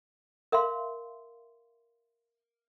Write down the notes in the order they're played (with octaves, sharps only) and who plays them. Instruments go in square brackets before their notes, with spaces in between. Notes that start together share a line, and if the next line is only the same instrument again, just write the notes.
[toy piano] A#4 E5 F5 C6